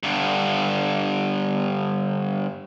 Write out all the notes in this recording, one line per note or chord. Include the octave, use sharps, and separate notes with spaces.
G2 D3